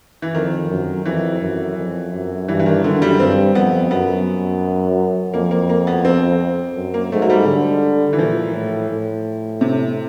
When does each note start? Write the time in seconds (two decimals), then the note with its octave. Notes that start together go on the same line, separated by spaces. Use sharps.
0.22 E3
0.34 F2 D#3
0.70 F#2
1.06 F2 E3
1.41 F#2
1.77 F2
2.12 F#2
2.48 G2 E3
2.59 E3
2.66 D#3
2.84 F#2 D3
3.02 G3
3.19 G2 C4
3.55 F2 B3
3.91 F#2 B3
5.33 F2 A#3
5.51 A#3
5.69 A#3
5.87 B3
6.05 C4
6.76 F#2
6.94 A#3
7.12 G#2 A3
7.22 F#3
7.30 G3
7.47 D3
8.13 E3
8.19 A#2 F3
8.54 A2
8.90 A2
9.61 C3